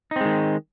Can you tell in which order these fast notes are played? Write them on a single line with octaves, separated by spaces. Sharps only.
D#4 C4 G#3 D#3